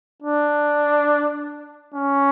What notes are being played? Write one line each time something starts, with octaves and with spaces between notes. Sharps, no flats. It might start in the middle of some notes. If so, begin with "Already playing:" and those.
D4
C#4